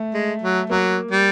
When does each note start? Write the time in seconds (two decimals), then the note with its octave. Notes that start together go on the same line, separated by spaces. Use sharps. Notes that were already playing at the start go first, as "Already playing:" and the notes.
Already playing: A3
0.14 G#3
0.42 F#3
0.70 F#3 A#3
1.11 G3